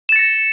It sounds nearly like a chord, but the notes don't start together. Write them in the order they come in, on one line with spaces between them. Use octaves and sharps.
E7 A6 C#7 A#6